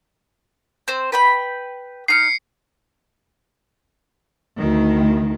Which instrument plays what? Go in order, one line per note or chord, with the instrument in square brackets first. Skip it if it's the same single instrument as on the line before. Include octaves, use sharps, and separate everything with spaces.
[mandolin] C4 C5
B4 G5 B5
[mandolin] D#4 F6 [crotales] C7 C#7
[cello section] D2 D#3